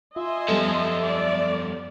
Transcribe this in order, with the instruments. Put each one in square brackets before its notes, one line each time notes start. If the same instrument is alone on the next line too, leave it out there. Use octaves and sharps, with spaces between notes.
[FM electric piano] F4 [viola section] D#5 G#5 C6 [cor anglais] E5
[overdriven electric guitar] F#2 F3 [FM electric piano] G3 B3 A4
[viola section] D5